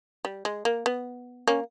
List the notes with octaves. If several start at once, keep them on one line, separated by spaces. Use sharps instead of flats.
G3
G#3
A#3
B3
A#3 C#4